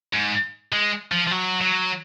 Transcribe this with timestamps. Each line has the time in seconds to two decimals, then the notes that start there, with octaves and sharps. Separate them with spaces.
0.13 G#2
0.72 G#3
1.11 F3
1.27 F3
1.31 F#3
1.61 F#3